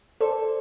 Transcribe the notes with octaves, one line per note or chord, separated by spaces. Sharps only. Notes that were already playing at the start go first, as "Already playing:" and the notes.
A4 C5 D5